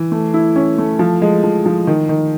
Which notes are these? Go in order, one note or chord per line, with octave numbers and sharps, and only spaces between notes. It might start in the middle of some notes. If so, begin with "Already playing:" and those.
Already playing: E3
A3
E4
C#4
A3
F3
G#3
F3
F3
D#3
D#3